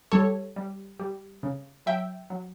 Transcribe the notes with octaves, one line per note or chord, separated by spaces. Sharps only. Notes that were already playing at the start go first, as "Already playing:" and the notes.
G3 A4 C#5
G3
G3
C#3
F#3 E5 G5
F#3